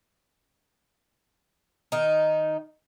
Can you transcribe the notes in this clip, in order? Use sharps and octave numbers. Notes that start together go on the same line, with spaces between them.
D#3 D#4